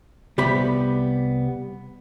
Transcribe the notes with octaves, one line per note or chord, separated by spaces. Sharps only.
C2 G3 B3 G4 B5